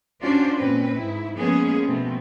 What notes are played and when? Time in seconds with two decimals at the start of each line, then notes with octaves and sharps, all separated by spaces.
0.22 C#4 D4 F4 F#4 C5 D5
0.56 A#2 C4 C#4 B4
0.96 G#2 E4
1.37 F3 G#3 A#3 B3 C#4 G#4
1.85 B2 F3 A3 C4